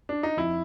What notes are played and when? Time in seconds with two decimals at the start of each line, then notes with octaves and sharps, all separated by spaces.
0.09 D4
0.23 D#4
0.37 F2 E4